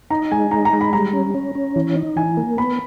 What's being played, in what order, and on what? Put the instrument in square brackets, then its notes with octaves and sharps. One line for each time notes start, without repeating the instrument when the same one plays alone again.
[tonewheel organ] D#4 [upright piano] A#5
[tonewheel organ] G#3 [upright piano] G#5
[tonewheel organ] D#4 [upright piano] A#5
[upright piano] A#5
[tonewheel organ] G#3
[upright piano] B5
[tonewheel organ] G3 [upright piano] A#5
[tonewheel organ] C#4
C#4
C#4
E3
D#4
[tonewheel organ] E3 [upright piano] G#5
[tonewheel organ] A#3
[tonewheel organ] B3 [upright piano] B5